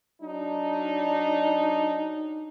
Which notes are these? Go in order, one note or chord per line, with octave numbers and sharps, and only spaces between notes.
F#3 D4 D#4